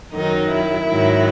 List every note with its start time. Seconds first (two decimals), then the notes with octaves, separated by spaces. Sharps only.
0.13 F#2 D#3 F#3 D#4
0.51 E4
0.89 G#2 D#3 F#3